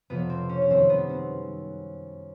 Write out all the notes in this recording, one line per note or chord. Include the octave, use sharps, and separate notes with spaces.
F2 C3 F3 B3
C4
C#4
C#4
F#2 D#3 G3 C4
B3
C4